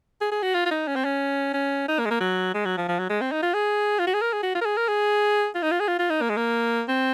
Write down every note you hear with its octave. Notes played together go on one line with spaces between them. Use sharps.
G#4
G#4
F#4
F4
F4
D#4
C#4
C4
C#4
C#4
D#4
A#3
G#3
A#3
F#3
G#3
F#3
F3
F3
F#3
G#3
C4
D#4
F4
G#4
F4
F#4
G#4
A#4
G#4
F#4
F4
A#4
G#4
A#4
G#4
F4
D#4
F4
G#4
F4
F4
D#4
A#3
G#3
A#3
C4